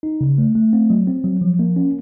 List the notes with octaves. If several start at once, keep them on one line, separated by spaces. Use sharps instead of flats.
D#4
C#3
A3
A3
C4
F#3
C4
F#3
F3
A#3
C#4